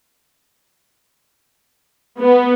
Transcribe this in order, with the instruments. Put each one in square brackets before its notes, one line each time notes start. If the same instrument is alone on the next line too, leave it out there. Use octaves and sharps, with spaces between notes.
[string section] B3